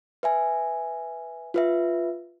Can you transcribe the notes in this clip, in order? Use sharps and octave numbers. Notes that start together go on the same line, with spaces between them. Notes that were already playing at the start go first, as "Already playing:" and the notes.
B4 E5 G#5
F4 B4 E5